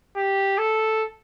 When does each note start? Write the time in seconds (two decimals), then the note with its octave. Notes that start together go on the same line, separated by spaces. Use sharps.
0.16 G4
0.58 A4